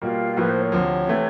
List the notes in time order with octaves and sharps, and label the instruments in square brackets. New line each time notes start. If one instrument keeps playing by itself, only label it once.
[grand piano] B2 G3 A#3 [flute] F4
[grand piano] A2 F3 A#3 [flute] B4
[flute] C5
C#5
[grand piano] D2 C3 F3
C3 E3 A3